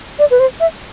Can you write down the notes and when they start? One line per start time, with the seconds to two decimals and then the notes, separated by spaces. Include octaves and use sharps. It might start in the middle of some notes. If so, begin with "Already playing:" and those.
0.19 D5
0.31 B4
0.39 C5
0.60 E5